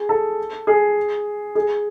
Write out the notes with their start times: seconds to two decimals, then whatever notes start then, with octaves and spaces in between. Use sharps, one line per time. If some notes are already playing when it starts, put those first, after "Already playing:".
Already playing: G#4
0.09 A4
0.67 G#4
1.55 G#4